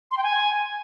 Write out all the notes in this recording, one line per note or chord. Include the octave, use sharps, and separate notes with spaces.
C6
G5
G#5